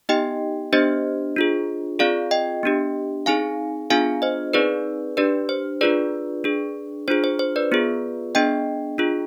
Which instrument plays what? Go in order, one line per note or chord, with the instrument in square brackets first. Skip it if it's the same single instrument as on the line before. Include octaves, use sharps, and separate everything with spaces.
[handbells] B3 D#4 G4 D#5 G5
B3 D4 G4 C5 D#5
D4 F4 G#4
C4 F4 G#4 D5 F5
D#5 G5
B3 D4 G4
C4 D#4 G#4 F5 G#5
B3 D4 F4 G#4 F5 G#5
C5 D#5
C4 D#4 G#4 B4 D5
D4 G4 B4 D5
C5
D4 F4 G#4 B4 D5
D4 G#4
D4 F4 G#4 C5
C5
C5
B4 D5
B3 F4 G#4
B3 D4 G#4 D#5 G5
D4 F4 G#4